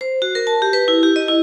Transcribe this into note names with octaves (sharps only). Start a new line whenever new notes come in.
C5
F#4
A#4
A5
G4
B4
E4
G4
D#5
E4